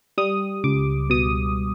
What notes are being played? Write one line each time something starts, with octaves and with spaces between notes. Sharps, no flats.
G3 D#6
C#2 D6
B2 D#6